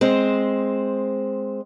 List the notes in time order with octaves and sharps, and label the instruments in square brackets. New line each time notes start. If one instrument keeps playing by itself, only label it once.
[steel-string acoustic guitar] G#3 C4 C5